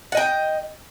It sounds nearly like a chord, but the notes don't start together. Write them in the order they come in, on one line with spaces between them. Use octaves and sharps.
F#5 D#5 G5